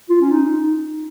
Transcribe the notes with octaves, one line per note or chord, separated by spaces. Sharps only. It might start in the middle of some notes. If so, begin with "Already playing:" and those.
F4
C#4
D#4